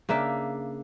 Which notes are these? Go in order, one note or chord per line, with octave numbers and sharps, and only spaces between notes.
C#3 A#3 D4 E5